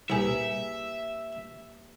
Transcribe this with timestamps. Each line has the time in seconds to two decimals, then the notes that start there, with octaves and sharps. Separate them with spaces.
0.10 C2 A#3 G4 G#4 B4 E5